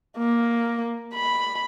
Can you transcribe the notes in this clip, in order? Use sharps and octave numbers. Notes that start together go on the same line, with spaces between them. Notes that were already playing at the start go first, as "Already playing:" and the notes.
A#3
B5